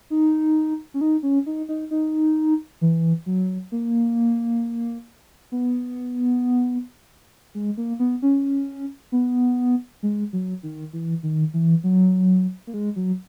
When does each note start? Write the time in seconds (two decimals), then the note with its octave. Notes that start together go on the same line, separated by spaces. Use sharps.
0.10 D#4
0.94 C#4
1.01 D#4
1.23 C#4
1.46 D#4
1.69 D#4
1.91 D#4
2.81 E3
3.26 F#3
3.72 A#3
5.52 B3
7.55 G#3
7.77 A#3
7.99 B3
8.22 C#4
9.12 B3
10.03 G#3
10.33 F#3
10.63 D#3
10.93 E3
11.23 D#3
11.54 E3
11.84 F#3
12.67 A#3
12.74 G#3
12.96 F#3